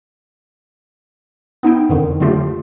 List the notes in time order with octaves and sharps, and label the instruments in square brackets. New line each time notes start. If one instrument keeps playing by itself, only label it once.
[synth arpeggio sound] B3 D#4 E4 G5
F2 D3 D#3
D3 F#3 A3 F4 G4